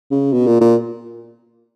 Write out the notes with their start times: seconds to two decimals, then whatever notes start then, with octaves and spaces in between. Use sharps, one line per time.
0.11 C#3
0.33 B2
0.47 A#2
0.61 A#2